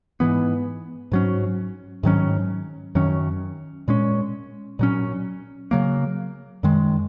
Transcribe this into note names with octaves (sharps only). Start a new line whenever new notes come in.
G#2 E3 B3
G#2 F#3 C#4
G#2 D#3 F#3 C#4
F#2 D#3 F#3 C#4
A#2 G#3 C#4
A#2 F#3 C#4
C#3 F#3 A#3
F#2 D#3 G#3